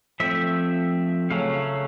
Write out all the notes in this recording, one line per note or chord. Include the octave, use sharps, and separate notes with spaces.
F3 A3 C4 E5
C#3 F#3 A3 C#4 F5